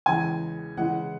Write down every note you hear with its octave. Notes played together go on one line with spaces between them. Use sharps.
E2 C#3 E3 G#3 G#5
C#3 E3 G#3 F#5